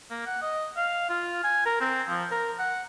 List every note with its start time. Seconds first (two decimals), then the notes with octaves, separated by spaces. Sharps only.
0.10 A#3
0.26 F#5
0.42 D#5
0.77 F5
1.10 F4
1.44 G#5
1.66 A#4
1.81 C4
2.09 F3
2.31 A#4
2.59 F#5